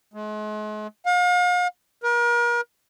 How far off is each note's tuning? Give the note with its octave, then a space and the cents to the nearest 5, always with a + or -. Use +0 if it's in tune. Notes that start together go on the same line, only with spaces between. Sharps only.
G#3 +40
F5 +40
A#4 +40